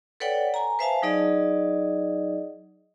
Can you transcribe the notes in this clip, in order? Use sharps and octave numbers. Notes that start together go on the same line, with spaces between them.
A4 B4 C#5 D5 F#5 G5
G#5 A#5
B4 C5 E5 F5 G#5 A5
F#3 D#4 G#4 D5 D#5